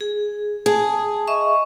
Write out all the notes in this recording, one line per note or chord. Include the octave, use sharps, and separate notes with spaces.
G#4
G#4 A5
D#5 E5 C#6